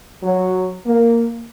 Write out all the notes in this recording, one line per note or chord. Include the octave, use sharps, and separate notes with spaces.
F#3
A#3